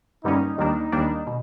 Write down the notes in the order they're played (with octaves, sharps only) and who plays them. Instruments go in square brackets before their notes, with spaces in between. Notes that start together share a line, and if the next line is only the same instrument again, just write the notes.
[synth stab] G2 D3 G3 A#3 C#4 [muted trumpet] D#4
[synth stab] D#2 D#3 G3 A#3 D4 [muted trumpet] D#4
[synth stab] D#2 D#3 G3 A#3 D4
B2